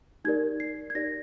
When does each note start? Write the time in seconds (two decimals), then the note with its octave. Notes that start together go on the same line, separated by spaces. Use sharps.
0.25 D#4 G4 A#4 D5 G#6
0.60 C7
0.90 G#6
0.95 D#4 G4 A#4 D5 A#6